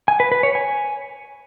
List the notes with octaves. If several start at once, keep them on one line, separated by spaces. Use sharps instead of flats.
G#5
B4
B4
C#5
G#5